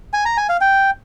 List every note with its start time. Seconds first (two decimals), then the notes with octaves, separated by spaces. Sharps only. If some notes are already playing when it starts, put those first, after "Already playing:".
0.13 G#5
0.25 A#5
0.37 G#5
0.49 F5
0.61 G5